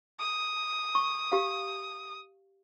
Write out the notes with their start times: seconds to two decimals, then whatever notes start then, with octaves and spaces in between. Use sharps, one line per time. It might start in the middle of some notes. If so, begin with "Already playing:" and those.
0.20 D#6
0.95 C#6
1.32 G4 F5